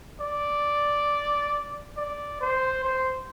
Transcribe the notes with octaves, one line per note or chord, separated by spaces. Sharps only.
D5
D5
C5
C5